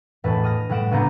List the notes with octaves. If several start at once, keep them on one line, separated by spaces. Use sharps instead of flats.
E1 A2 B4 A5
D#6 F6 A#6
A2 G3 F#5 D7 E7
C#2 G#2 B3 D4 A#5 G6